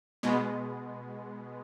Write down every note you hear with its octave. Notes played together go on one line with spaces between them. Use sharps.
B2 G#3 B3